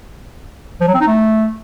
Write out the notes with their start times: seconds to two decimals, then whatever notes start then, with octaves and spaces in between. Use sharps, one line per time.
0.81 F3
0.87 F#3
0.94 C4
1.01 D#4
1.07 A3